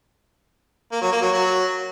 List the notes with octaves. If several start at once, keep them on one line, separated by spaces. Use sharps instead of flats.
A#3
F#3
A#3
F#3
F#3